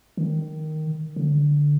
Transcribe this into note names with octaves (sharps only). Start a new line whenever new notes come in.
D#3
D3